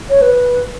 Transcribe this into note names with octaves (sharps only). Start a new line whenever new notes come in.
C#5
B4